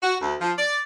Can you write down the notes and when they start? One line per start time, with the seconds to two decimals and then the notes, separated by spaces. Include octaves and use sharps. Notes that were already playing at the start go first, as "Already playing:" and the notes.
0.01 F#4
0.21 D2
0.41 F3
0.57 D5